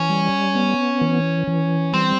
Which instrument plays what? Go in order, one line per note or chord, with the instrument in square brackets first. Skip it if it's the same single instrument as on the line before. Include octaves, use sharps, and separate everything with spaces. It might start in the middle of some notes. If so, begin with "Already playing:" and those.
Already playing: [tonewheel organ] E3 [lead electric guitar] C#4
[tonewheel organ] G3
B3
E3
E3
[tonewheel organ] G3 [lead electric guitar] C4